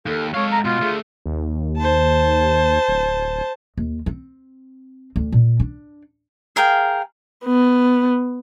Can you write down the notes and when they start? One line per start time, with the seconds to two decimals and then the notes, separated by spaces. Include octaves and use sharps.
0.06 D#2 A4
0.34 G#3 A4 C#5 F5
0.52 A#5
0.65 B2 F4
0.81 D2 A3 G#4
1.26 D#2
1.78 C5 A5
2.88 D1
3.77 D#2
4.06 C4
5.16 D2
5.32 A#2
5.60 D4
6.56 G#4 A#4 F5 G5
7.45 B3